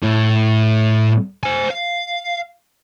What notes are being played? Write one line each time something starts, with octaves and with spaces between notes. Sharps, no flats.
A2
C5 G#5
F5